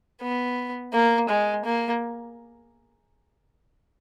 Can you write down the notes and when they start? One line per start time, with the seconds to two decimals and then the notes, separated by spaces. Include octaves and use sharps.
0.22 B3
0.94 A#3
1.29 G#3
1.65 A#3